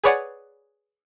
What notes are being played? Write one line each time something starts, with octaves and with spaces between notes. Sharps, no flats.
G#4 B4 C#5 D5 F#5 G#5